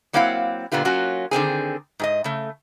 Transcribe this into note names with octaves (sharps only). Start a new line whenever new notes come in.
F#3 A#3 C4 E4 F5 F#5
A#2 D3 B3 F4 G4
F#3 A#3 C#4 F4 F#4
D3 D#3 C4 G#4
G#2 G4 D#5
C#3 A3